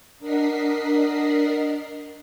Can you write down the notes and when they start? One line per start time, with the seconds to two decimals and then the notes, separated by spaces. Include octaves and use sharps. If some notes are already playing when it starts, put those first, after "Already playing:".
0.19 D4 A#4 D#5 F#5 B6 C7